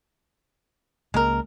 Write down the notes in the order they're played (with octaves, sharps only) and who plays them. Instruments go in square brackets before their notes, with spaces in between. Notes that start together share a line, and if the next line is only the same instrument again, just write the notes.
[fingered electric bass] C#2 A#3 [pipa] G#3 A#4